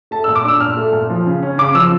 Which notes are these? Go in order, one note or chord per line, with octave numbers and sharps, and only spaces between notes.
A3 A5
E6
A#2
D6
D4 E6
A#2 F6
A3
A#2
F3
C#3
C#4
C#3 D6
F3 E6